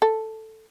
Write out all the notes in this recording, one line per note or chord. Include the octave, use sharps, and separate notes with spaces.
A4